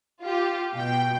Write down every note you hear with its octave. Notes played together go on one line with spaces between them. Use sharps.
F4 G4
B2 G5